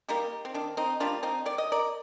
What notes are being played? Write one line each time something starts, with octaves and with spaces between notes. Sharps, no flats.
G3 A#3 D#4 G4
C4
D#3 D4
C4 D#4
G3 A#3 D4 F4
C4 D#4
D#3 D5
D#5
A#4 D5